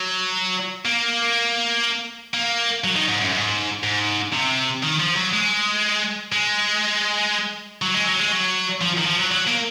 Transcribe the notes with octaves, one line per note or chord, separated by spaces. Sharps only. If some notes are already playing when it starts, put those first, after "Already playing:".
Already playing: F#3
A#3
A#3
F#3
D#3
G#2
F#2
G#2
G#2
C3
D#3
F3
F#3
G#3
G#3
F#3
G#3
F#3
G#3
F#3
F3
D#3
F3
F#3
F#3
A#3